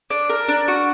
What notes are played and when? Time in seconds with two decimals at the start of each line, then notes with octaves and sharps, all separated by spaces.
0.10 D4
0.29 A#4
0.48 D4
0.68 F#4